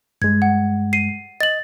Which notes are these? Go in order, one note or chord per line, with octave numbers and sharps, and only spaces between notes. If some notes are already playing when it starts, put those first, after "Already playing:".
G2 G#3 G#6
F#5
C7 D#7
D#5 A6 F#7